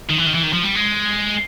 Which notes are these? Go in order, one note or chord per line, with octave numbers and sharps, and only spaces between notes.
D#3
E3
D#3
E3
D#3
F3
G3
G#3